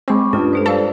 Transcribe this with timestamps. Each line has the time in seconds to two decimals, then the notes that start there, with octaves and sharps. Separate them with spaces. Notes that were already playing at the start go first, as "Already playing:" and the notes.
0.08 G#3 C4 B5 C#6 D6
0.33 G2 A3 C#4 D4 F4 D#6
0.53 G#3 F4 A4 C5
0.66 G3 A4 F5